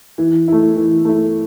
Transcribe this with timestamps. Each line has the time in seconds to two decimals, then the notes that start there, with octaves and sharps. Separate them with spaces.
0.18 E3
0.48 A3 E4
0.76 E3
1.05 A3 E4